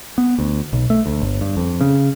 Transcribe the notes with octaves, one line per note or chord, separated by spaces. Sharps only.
B3
D2
B1
A3
D2
G1
G2
F2
C#3